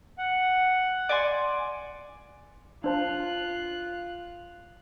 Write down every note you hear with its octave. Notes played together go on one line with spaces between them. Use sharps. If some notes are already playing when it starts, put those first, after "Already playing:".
F#5
D5 G#5 C6
D4 F4 C5 A5 F#6